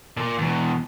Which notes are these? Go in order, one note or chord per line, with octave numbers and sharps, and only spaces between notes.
A#2
E2 B2